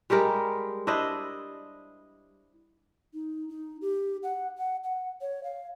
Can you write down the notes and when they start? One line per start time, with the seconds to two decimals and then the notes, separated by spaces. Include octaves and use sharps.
0.10 G3 G#3 G4 A#4
0.87 D4 E4 C5 D#5
3.14 D#4
3.49 D#4
3.81 G4
4.23 F#5
4.58 F#5
4.84 F#5
5.21 C#5
5.44 F5